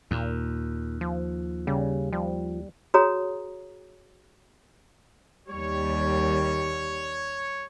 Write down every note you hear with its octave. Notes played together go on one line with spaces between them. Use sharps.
D#2 A#2
F3
C#3 G3
F3 G3
F#4 G#4 C#5 A#5 D#6
D#2 G3 C#5